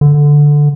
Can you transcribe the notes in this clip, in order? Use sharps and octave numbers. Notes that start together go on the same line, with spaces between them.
D3